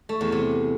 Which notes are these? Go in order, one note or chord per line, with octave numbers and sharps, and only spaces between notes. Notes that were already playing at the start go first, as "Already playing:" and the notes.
A3
E2
C3